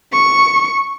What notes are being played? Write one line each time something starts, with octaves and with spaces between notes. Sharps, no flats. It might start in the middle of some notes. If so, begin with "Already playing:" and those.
C#6